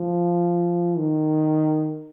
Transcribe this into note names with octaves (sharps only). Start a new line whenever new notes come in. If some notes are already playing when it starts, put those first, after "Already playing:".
Already playing: F3
D#3